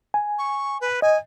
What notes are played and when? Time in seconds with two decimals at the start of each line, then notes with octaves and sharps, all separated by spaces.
0.14 G#5
0.38 C#6
0.81 B4
1.02 D#5 G#5